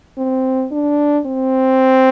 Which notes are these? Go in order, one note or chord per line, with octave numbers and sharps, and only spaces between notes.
C4
D4
C4